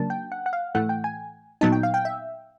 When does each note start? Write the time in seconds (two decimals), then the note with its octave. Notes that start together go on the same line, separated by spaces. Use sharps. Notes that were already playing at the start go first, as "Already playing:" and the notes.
Already playing: C#3 F#3 A#3 D4 A5
0.10 G5
0.32 F#5
0.46 F#5
0.53 F5
0.75 A2 E3 A3 F#5
0.89 G5
1.04 G#5
1.61 A#2 F#3 B3 D#4 A5
1.72 G5
1.83 F5
1.94 G5
2.05 E5